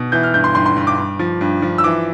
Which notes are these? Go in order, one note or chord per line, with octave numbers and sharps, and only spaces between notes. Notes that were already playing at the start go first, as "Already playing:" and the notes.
Already playing: B2
E3 G6
F6
G2 G6
C6
G2 C6
C6
G2
D6
G2
F3
G2
F3
E6
E3 D6